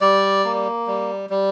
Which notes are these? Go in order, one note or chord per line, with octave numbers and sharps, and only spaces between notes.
G3 D5
A#3
G3
G3